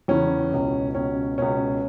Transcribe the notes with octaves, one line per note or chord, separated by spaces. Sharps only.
E2 C#3 E3 C#4
C#2 B2
C#2 B2 C#4
C#2 B2 C#4